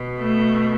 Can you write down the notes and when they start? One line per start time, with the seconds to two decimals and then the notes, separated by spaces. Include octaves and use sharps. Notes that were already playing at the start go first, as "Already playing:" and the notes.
Already playing: B2
0.17 A3